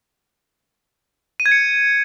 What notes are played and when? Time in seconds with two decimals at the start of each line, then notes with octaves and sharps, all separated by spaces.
1.40 D#7
1.46 G#6
1.52 C#7